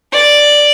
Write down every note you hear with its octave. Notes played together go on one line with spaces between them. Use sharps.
D5